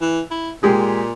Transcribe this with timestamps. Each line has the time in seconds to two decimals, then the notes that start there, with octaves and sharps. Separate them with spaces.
0.01 E3
0.31 E4
0.63 A#2 G#3 G4 G#4